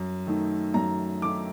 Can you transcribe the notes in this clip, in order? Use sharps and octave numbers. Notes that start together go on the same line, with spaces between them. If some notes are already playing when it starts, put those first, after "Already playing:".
Already playing: F#2
D#3 A3 D#4
F#2 A#5
D#3 A3 D#4 D6